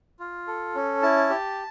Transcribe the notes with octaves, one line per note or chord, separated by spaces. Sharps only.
F4
A4
C#4
E4 A5
G4